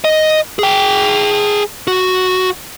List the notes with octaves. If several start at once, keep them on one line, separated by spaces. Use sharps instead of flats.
D#5
G#4 G5
F#4